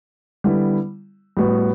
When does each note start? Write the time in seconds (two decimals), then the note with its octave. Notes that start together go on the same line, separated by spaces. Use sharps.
0.44 D3 G3 B3 E4
1.37 A2 G3 B3 F#4